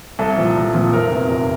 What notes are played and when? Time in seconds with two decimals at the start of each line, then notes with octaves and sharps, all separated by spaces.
0.19 C2 A4
0.37 A#2 F3
0.56 C2
0.74 A#2 F3
0.92 F1 A#4
1.11 E2 C3 E3
1.29 F1